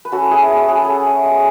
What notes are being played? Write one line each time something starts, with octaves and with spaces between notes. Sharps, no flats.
B4
C#4 F#4 A4
E4 G#4
E4 G#4
C#4 G#4
A4
C#4 G#4
A3
G#3